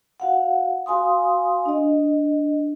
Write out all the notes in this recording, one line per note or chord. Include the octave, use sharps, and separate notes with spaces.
F#4 F5 F#5
F#4 F5 G#5 C6 D#6
D4 D#5